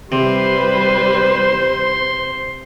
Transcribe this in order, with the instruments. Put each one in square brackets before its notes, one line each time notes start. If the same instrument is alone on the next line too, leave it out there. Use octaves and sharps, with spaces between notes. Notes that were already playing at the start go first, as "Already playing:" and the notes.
[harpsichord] C3 [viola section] G3 B4 [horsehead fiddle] C5 [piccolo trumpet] C6